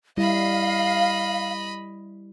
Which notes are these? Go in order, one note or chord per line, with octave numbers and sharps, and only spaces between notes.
G3 E4 D#5 F5 B5